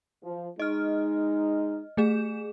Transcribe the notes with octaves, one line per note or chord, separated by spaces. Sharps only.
F3
G#3 D#4 D#5 F6
A3 G#4 E7